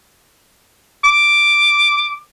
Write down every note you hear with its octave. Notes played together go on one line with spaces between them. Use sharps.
D6